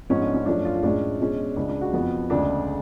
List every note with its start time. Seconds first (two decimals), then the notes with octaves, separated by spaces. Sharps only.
0.09 G#2 F3 B3 C#4
0.21 D4
0.34 C#4
0.46 F#2 F3 A3 C#4 D4
0.65 F4
0.75 F4
0.83 A2 G#3 C#4 D4
1.20 B2 G#3 C#4
1.56 C#2 C#3 G#3 D4
1.69 D4
1.81 F#4
1.93 F2 F3 B3
2.30 D2 C#3 G#3 D4